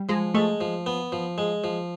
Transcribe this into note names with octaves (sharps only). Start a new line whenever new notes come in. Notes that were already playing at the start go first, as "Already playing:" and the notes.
Already playing: G3
F3 G#3
G#3 A3
F3
B3
F3
G#3
F3